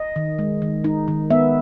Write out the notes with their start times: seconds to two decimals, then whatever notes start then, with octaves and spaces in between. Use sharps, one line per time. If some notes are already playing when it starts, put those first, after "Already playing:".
Already playing: D#5
0.16 D#3
0.39 G#3
0.62 D#3
0.84 D#4
1.08 D#3
1.30 B3 E5